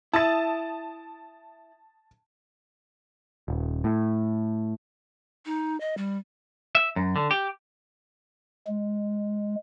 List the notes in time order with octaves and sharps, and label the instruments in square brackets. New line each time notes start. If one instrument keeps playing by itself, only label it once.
[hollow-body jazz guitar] E4 [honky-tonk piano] A5 D#6 A6
[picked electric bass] D#1
A2
[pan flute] D#4
D#5
G3
[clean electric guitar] E5
F#2
D3
G4
[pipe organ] G#3